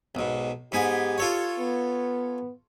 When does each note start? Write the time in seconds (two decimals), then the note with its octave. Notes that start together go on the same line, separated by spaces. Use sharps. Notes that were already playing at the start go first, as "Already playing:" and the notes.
0.15 B1 G#2 B2
0.72 G#2 B3 G4 G#5
1.18 F4 A4 C#5
1.59 B3